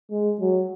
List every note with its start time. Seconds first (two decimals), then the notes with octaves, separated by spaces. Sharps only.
0.11 G#3
0.40 F#3